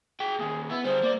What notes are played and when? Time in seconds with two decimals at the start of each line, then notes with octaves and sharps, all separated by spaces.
0.20 G#4 G5
0.39 A#2 D#3 G#4
0.70 B3 E4
0.85 D3 G3 G#4 C5
1.03 A#3 D5